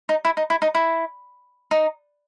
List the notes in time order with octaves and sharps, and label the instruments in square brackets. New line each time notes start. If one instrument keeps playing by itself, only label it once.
[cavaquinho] D#4
E4
D#4
E4
D#4
E4
D#4